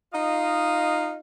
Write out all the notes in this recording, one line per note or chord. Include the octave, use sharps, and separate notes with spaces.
D#4 F4 D#5 F5